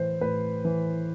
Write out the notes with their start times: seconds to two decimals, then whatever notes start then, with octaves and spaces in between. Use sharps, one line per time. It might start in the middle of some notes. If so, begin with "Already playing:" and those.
Already playing: A2 E3 C5
0.21 A2 B4
0.65 E3